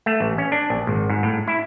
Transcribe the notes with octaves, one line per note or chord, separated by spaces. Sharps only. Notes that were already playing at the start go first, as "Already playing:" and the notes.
A3
A1
C#4
D4
A#1
G#1
G#2
A2
E4